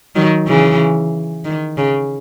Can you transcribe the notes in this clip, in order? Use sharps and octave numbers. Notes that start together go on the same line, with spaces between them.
D#3 F#3
C#3 E3
D#3
C#3